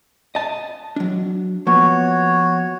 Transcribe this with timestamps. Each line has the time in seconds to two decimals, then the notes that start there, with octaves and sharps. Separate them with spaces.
0.35 D#5 A5
0.96 F#3 D4
1.67 F3 A#3 B3 F#4 C#5